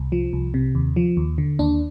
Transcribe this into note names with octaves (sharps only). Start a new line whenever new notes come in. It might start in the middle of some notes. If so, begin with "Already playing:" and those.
Already playing: C2
F3
C2
C3
D#2
F3
D#2
D3
D#2 D4